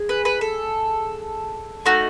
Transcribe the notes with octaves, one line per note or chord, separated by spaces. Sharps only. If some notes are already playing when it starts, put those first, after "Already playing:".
Already playing: G#4
B4
B4
A4
A3 D#4 F#4